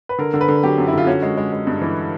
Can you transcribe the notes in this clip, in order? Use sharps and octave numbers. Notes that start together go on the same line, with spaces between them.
B4
D3 A#4
D3
B4
D3
F#3 G4
F#2
E4
D3 F4
C#4 F#4
G#3
G#3
G#3
G2
E3